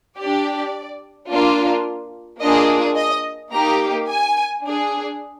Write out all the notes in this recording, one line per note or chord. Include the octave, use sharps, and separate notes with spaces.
D4 G4 D5
A#3 D4 F4
A#3 D4 F4 G#4 D#5
D#5
A#3 D#4 G4 A#5
G#5
D4 G#4